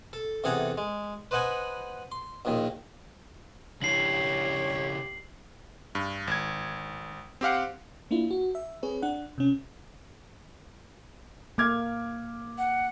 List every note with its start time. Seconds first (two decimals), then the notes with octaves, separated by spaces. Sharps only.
0.13 A4
0.44 E2 C3 G#4 A4 F#5 A#5
0.78 G#3
1.31 B4 C5 D#5 F#5 G#5 B5
2.12 C6
2.45 A#1 D#2 A#2 D#3
3.82 C#3 D4 E4 G4 C#5 C7 F#7
5.95 G2
6.27 G#1 G#6
7.41 C4 G4 F5 F#5
8.11 A#3 D4 E4 F4
8.31 F#4
8.55 E5
8.83 C4 G#4 B4 C#5
9.02 D4 F#5
9.38 C3 C#4
11.58 A#3 D6 F6 G#6
12.58 F#5